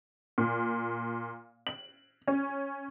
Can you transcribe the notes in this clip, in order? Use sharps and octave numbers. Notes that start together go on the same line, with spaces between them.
A#2
F#7
C#4